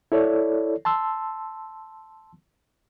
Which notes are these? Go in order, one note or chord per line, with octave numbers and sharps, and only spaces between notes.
E4 A4 C#5 D5
A5 C6 E6